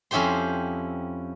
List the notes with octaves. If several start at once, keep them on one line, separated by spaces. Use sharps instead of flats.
F2 C#4 E4 G4 C5 C6